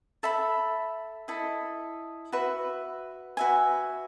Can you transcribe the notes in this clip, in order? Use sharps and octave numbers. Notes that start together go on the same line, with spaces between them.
A4 E5 B5
E4 A4 D#5
F#4 B4 E5
F#4 B4 E5 G#5